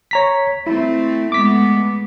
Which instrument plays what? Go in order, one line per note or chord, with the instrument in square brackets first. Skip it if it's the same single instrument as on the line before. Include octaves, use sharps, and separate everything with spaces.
[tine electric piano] C#5 A#5 B6
[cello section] A3 C4 [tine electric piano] E4
[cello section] G#3 A3 B3 [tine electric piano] D6 B6